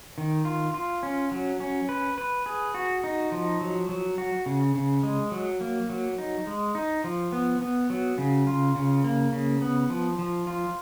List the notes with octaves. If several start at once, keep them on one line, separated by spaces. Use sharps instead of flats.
D#3
F4
F4
C#4
F#3
C#4
B4
B4
G#4
F#4
D#4
F3
F#3
F#3
F#4
C#3
C#3
G#3
F#3
A#3
F#3
D#4
G#3
D#4
F3
B3
B3
F#3
C#3
F4
C#3
A#3
C#3
B3
F3
F3
F4